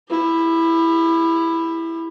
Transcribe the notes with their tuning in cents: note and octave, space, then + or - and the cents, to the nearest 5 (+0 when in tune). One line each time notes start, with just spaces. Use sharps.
E4 +0 G4 +40